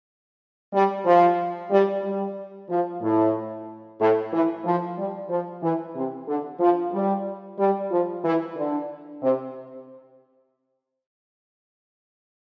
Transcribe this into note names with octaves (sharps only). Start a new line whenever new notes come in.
G3
F3
G3
G3
F3
A2
A2
E3
F3
G3
F3
E3
C3
D3
F3
G3
G3
F3
E3
D3
C3